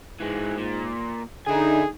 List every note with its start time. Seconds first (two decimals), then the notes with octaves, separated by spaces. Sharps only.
0.20 G#2 E3 G#3
0.58 A#2
1.47 D3 D#4 G#4 E5 G#5